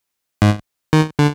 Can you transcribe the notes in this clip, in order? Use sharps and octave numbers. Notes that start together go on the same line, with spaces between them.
G#2
D#3
D3